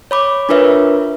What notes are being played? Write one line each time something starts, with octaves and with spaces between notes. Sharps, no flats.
C#5 B5 D6
D4 F4 A#4 B4 C#5 E5